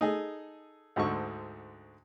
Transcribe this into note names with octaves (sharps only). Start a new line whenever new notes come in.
D#4 G#4 A4
D2 G#2 D3 C#6